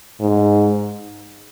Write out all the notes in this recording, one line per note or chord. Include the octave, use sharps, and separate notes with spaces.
G#2